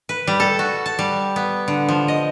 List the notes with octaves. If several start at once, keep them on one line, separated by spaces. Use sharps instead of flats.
B4
G3
A4
F#4
A5
G3
B3
D3
F3
D#5